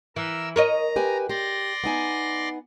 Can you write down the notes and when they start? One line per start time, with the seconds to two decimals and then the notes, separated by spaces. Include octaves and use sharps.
0.16 E3 A#4 E6
0.56 A#4 C#5 D#5 A#5
0.96 G4 B4 G#5
1.29 G4 D5 C6 A#6
1.84 B3 D#4 G#5